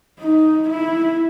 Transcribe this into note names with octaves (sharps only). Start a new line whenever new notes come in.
D#4
E4